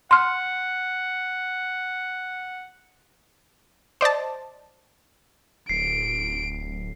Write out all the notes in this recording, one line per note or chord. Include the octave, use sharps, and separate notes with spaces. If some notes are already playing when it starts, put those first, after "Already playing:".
F#5 C6 F6
C5 D5 D#5 A5
D1 C7 D7